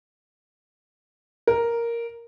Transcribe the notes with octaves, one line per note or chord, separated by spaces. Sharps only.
A#4